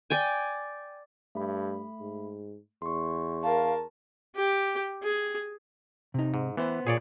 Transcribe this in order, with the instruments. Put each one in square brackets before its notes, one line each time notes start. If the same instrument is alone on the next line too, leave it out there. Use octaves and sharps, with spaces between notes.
[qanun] D5 G5 G#5
[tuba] G2 [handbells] A3 B5
[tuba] G#2
[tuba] E2 [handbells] C6 C#6
[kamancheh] A#4 A5 [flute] F5
[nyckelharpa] G4
G#4
[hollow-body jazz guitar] C3 D#4
[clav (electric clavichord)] G#2
[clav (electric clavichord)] E3 [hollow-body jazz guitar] B3 C5
[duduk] A#2 [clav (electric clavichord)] G#4 C#5 D5